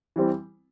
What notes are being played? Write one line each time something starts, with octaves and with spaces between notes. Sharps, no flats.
E3 G3 C4